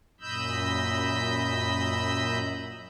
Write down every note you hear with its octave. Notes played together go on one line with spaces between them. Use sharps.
F#2 A#2 D#5 B5 E6 G6